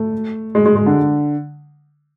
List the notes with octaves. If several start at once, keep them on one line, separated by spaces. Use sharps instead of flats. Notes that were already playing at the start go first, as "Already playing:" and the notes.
Already playing: A3
G#3
G#3
G#3
D3